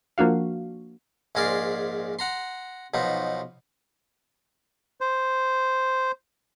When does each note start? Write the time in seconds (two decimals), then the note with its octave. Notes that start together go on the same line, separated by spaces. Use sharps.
0.18 F3 A#3 D4 F#4 F5
1.35 A#1 G#2 G#4 A#4 D5 C6
2.19 F#5 A#5 C6
2.94 B1 B2 F3 D#4
5.01 C5